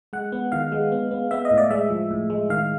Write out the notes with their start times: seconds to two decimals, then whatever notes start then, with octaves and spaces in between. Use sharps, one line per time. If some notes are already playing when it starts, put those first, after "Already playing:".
0.13 G#3 F#5
0.32 B3
0.52 D#3 F5
0.72 G#3
0.92 B3
1.11 B3
1.31 B3 E5
1.45 D#5
1.51 A2
1.58 D5
1.71 G#3 E5
1.90 F3
2.11 A2
2.30 G#3
2.50 D#3 F5